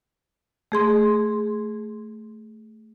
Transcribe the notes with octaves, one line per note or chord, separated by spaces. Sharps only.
A3 G#4 C6